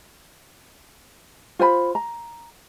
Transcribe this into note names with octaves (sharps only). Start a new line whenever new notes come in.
F4 C5 G5 B5
A#5